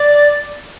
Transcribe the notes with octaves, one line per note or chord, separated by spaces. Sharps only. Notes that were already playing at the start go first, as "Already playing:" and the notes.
Already playing: D5